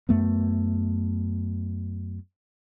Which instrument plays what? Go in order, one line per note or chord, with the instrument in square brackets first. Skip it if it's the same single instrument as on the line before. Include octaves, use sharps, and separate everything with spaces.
[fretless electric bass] F#2 A3 B3